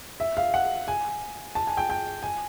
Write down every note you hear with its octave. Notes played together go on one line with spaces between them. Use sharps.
E5
F5
F#5
G#5
A5
G#5
G5
G5
G#5